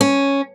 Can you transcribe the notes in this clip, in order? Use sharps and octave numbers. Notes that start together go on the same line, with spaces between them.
C#4